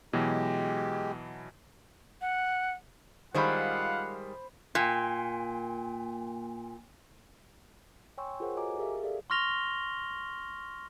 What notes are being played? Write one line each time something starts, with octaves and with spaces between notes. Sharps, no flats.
B2 E3 F#3 G#3 G4
F#5
D#3 G3 G#3 F4 C5 F5 F#5 B5
A#2 A#3 G5 G#5 C6
C#5 G5 G#5 C6 C#6 E6
F4 G#4 A#4 C5 C#5 F#5
F#4 A4 D#5 G#5 A#5 D6
G4 G#4 A#4 E5 F5
G#4 A4 D5 E5 F5
C6 C#6 F6 A#6 F7 G7